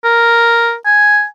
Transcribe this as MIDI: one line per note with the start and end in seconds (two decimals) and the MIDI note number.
0.04 0.75 70
0.86 1.25 80